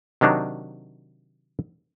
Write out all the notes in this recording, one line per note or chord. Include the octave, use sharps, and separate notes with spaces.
C3 D#3 F#3 D4 D#4